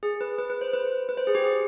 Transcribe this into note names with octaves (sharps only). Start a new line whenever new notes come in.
G#4
B4
B4
B4
C5
B4
B4
C5
G#4
G4
G#4